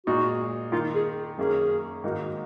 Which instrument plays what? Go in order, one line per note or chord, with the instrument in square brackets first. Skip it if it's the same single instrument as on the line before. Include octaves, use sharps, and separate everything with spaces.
[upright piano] A#2 G#3 D#4 G#4 [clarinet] F#4
[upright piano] D#3 A#3 D#4 [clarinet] F4
[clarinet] G#4
[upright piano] F#2 D#3 A#3 C#4 [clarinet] G#4
[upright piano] G#2 D#3 A#3 D#4 F#4